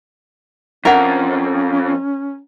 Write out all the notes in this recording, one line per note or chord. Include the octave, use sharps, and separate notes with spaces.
F2 C#4 D4 A#4 E5 F#5